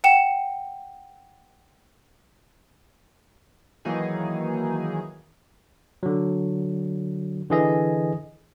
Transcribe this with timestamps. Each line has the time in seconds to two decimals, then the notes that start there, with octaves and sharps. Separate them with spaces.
0.04 F#5 G5 C#7 E7
3.85 D#3 E3 F#3 A#3 D#4 G#4
6.03 D3 F#3
7.50 D3 E3 G#4 D#5